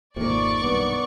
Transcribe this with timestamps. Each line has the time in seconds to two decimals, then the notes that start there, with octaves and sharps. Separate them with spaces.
0.16 G#1 F2 C3 D#3 A#3 D5 C#6
0.63 B1 G2 B3